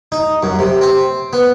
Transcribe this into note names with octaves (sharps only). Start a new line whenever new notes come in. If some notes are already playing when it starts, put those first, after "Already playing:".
D#4
F#2
C3
C4
B3